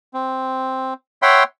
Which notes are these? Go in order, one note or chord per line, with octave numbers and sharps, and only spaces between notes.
C4
C#5 E5 F#5 G5 B5 C6